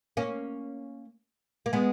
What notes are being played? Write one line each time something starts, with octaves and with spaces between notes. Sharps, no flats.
A#3 C#4
A#3
G#3 B3